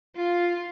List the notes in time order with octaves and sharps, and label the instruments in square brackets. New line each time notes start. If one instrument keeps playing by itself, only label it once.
[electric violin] F4